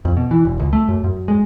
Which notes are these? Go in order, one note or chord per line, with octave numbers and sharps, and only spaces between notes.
F2
B2
E3
E1
C#2
A3
F#2
F#2
G#3